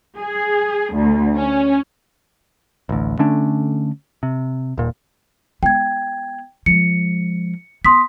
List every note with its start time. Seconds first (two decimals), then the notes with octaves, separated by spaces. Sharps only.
0.19 G#4
0.94 D2
1.36 C#4
2.89 A1 D2
3.19 D3 A3 C#4 D4
4.23 C3
4.78 D#1 A#2
5.63 G#3 B3 G5 G#6
6.66 F3 G#3 C#7
7.85 B3 C6 D#6 B6